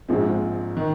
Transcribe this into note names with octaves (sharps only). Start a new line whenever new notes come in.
A#1 G#2 F3 G#3 C4
D#3